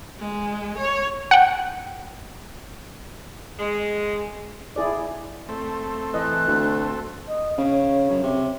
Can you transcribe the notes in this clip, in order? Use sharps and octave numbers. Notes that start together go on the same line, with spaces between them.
G#3
C#5
F#5 G5
G#3
E4 G#4 D5
A3 C4
E3 D#5 F#6
D2
D#5
C#3 C#5
F#2
C3